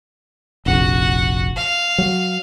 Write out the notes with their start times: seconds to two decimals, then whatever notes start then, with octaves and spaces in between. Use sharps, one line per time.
0.66 F1 A#1 F#4 F#5
1.57 F5
1.98 F#3